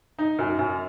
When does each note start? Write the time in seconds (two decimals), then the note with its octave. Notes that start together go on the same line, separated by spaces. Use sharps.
0.19 D#4
0.39 F#2
0.59 F#2